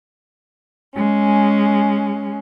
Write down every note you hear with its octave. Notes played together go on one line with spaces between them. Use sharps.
G#3 C#4